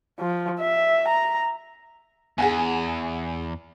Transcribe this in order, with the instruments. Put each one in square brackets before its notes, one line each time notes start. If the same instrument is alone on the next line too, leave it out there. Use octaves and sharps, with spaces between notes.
[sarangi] F3
E5
A#5
[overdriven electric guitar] E2 [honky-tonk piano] G#4 F#5 G#5